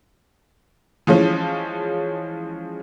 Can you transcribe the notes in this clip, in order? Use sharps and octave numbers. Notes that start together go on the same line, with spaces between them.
E3 F3 G#3 C#4